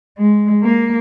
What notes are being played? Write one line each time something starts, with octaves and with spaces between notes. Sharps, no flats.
G#3
A#3